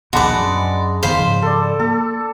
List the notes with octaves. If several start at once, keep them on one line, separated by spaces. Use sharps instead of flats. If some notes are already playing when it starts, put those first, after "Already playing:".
A#1 D#2 B2 G#3 D4 F#4 B4 D5
F#2
E1 D#3 B3 C5 F5 B5
G#2 C#3 F3
A4 D5
A#3 A4